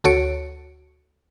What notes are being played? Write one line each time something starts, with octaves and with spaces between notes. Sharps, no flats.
D2 F#4 A4 C#5 C#7 D7